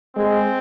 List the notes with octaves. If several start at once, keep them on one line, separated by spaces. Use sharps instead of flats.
G#3 C4